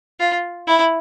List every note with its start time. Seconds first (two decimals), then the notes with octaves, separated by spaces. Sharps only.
0.20 F4
0.67 E4